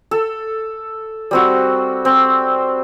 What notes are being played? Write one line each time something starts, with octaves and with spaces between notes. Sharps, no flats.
A4
G3 C4 F#4
C4